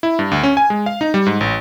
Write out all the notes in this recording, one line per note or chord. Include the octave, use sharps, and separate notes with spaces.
E4
G2
D2
C#4
G#5
G#3
F5
D#4
G3
G#2
A1